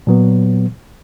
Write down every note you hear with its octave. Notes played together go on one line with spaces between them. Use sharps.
A#2 F#3 B3